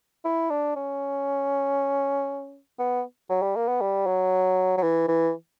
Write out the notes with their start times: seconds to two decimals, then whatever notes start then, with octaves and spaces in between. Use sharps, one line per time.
0.25 E4
0.50 D4
0.76 C#4
2.79 B3
3.30 F#3
3.42 G3
3.56 A#3
3.68 B3
3.81 G3
4.06 F#3
4.78 F#3
4.83 E3
5.08 E3